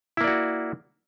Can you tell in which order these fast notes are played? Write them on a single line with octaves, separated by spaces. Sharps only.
E4 A#3 D5 F#4